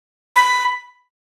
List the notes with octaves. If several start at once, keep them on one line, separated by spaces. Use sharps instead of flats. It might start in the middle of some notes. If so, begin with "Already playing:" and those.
B5